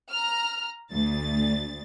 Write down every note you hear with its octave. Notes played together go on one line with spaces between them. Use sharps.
A#5 F6
D2 A6